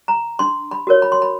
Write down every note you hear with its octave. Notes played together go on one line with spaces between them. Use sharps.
A#5
D4 C6
B5
F#4 A#4 C#5
B5
C6
B5